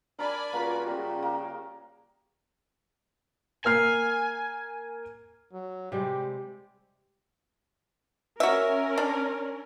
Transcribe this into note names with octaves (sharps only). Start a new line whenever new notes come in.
D4 A#4 D5 G#5 A5 B5
C#2 A#3 F4 F#4 C#6
C#3 G3
A#3
A#3 G#5 F6 C7
F#3
C3 G3 G#3 G4
C#4 F#4 A#4 E5
D4